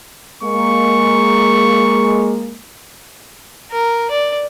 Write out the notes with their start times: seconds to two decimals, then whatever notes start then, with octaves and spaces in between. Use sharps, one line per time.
0.43 G#3 A#3 C#6
3.72 A#4
4.11 D5